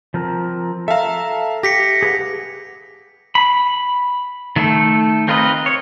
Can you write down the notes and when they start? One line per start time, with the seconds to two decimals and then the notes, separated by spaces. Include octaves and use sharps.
0.14 F3 C4 A#4
0.88 A4 E5 F5 A#5
1.63 G4 A#6 B6 C#7
2.02 G#4 B4 F#5
3.35 B5
4.56 D#3 A3 A4
5.28 C4 F4 A#4 B4 D#5
5.66 C#5